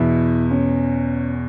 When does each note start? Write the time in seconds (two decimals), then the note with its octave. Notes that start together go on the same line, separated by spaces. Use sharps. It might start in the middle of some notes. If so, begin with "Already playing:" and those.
Already playing: E2 B2 E4
0.51 C#4